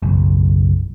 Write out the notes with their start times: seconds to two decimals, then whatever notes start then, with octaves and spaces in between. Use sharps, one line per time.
0.02 F#1 B1